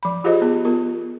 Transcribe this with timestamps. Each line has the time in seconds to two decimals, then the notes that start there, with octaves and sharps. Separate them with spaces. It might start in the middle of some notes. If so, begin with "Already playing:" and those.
0.03 F3 B5
0.24 F4 G4 G#4 C5 D#5
0.42 B3 G#4
0.65 B3 F4 A#4